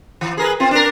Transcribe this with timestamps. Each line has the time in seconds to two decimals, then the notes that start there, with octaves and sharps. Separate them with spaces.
0.21 E3
0.37 G#4 A#4 B4
0.60 C4 F4
0.71 D4 A#4